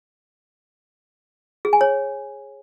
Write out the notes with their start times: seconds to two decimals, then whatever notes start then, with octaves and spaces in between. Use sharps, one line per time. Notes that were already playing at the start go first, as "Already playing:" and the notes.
1.65 G#4
1.73 G#5
1.81 C#5